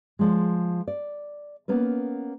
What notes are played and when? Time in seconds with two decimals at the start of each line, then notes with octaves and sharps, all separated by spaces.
0.19 F3 G#3
0.88 D5
1.68 A#3 B3 C#4 B4